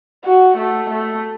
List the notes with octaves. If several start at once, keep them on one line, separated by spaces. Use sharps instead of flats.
F#4
A3
A3